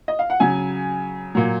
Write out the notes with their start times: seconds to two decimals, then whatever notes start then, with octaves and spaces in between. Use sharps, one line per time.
0.08 D#5
0.19 F5
0.30 F#5
0.40 C#3 F#3 G#5
1.35 A#2 F#3